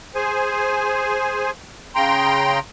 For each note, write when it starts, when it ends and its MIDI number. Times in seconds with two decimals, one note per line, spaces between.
0.15 1.51 68
0.15 1.51 72
0.15 1.51 80
1.95 2.59 49
1.95 2.59 79
1.95 2.59 82
1.95 2.59 84